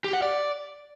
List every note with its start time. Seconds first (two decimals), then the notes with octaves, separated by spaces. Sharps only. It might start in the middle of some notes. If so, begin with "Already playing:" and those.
0.04 G4
0.13 F#5
0.22 D5